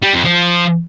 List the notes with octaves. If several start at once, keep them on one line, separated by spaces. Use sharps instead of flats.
G3
F2
F3